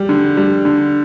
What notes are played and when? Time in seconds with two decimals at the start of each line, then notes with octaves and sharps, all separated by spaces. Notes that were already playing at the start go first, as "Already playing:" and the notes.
Already playing: G3
0.09 D3
0.37 G3
0.65 D3